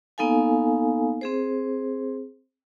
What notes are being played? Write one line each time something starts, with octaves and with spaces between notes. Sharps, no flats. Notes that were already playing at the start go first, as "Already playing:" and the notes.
A#3 B3 D#4 A4 F5 G#5
C4 G#4 C5